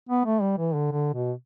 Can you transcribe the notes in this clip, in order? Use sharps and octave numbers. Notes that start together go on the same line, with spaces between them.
B3
A3
G3
E3
D3
D3
B2